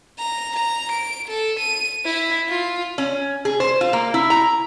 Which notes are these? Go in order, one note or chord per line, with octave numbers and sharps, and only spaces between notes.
A#5
A#5
D7
A4
D#7
E4
F4
C#4
G#4
C5
F4
A#3
E4
A#5